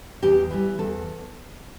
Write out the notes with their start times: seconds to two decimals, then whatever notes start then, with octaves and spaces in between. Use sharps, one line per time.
0.23 E2 G4
0.50 E3 G3
0.79 E2 A4